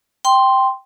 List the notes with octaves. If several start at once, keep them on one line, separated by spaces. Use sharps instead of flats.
G5 C6